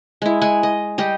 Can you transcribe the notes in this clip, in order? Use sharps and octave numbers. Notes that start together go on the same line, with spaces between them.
G#3 E4
G#3 F#5 G#5
D#5
G3 G4 D#5